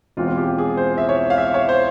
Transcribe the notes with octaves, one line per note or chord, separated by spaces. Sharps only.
E1 E2 E3 G#3 C4 F4
F4
G4
G#4
C5
E5
C#5
F5
E5
C#5
C5